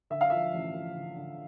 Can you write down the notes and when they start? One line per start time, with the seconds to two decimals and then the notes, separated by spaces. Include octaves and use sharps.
0.10 D3 E5
0.21 F5
0.30 F3 E5
0.54 A1
0.74 F3
0.95 D3
1.16 D3